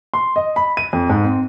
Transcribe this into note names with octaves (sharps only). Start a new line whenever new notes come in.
C6
D#5
B5
D#7
F2
G#2
C4